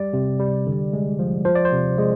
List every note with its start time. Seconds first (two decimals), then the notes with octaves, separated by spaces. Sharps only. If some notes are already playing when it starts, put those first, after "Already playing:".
Already playing: G3 D5
0.13 C3
0.40 G3
0.67 D3
0.93 G#3
1.19 F3
1.45 F3 C5
1.55 D5
1.65 C5
1.72 C3
1.98 G#3